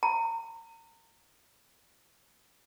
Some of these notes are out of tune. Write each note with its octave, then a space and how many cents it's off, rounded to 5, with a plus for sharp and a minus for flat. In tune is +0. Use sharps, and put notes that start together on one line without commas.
A#5 -35